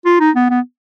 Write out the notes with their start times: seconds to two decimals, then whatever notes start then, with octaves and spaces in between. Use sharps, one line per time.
0.05 F4
0.20 D#4
0.35 B3
0.50 B3